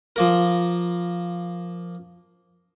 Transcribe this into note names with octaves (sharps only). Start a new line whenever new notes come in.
F3 A#3 A#4